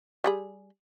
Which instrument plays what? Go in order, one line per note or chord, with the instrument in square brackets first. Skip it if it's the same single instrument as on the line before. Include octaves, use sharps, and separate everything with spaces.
[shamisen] G3 G#4 B5